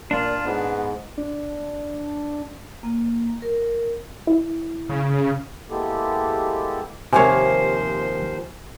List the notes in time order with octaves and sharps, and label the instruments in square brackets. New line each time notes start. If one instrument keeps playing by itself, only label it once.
[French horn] A#2 [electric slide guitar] D4 [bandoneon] F4
[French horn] G#2 [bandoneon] B3
[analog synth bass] D4
[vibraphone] A#3
A#4
[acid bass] E4
[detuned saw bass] C#3
[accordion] G#3 A#3 B3 E4 G4 A4
[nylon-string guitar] D#2 F3 A#3 [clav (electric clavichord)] C3 C#5 [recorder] C5 [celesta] G#5